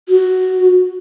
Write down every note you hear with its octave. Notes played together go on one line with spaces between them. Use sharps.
F#4